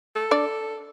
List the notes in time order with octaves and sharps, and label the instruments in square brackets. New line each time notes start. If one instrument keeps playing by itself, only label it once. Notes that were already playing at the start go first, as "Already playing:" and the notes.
[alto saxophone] A4
[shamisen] D4 D5